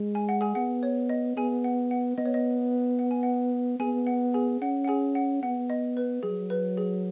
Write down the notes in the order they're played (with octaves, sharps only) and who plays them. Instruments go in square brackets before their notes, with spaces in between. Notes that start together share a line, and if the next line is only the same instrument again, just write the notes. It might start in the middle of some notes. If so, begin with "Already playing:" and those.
Already playing: [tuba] G#3
[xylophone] G#5
F#5
G#4 G#5
[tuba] B3 [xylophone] F#5
[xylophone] C#5
D#5
[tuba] B3 [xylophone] G#4 G#5
[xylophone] F#5
F#5
[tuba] B3 [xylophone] D#5
[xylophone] C#5
D#5
F#5
G#5
F#5
[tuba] B3 [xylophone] G#4 G#5
[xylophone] F#5
G#4 G#5
[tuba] C#4 [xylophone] F#5
[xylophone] F#5
G#4 G#5
F#5
[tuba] B3 [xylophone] F#5
[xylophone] D#5
B4
[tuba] F#3 [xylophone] G#4
[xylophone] B4
G#4